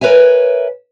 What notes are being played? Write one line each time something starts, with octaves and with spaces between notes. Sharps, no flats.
A#4 B4 C#5 E5 G#5